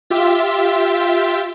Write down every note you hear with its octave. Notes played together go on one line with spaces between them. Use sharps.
F4 G4 E5